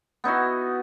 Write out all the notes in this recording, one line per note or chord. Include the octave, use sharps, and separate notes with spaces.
B3 D#4 E4 F#4